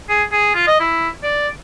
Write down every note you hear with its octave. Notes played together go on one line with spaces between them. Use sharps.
G#4
G#4
F4
D#5
E4
D5